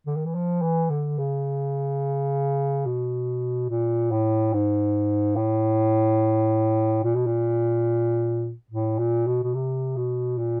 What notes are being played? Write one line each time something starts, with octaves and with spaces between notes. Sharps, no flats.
D3
D#3
E3
F3
E3
D3
C#3
B2
A#2
A2
G#2
A2
A#2
B2
A#2
A2
A#2
B2
B2
C3
B2
A#2